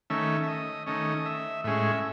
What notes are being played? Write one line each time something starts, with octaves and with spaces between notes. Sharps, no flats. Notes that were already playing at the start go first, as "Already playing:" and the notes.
D#3 A3 C#4 E5
E5
D#5
D#3 A3 C#4 D#5
E5
A2 G#3 C#4 E5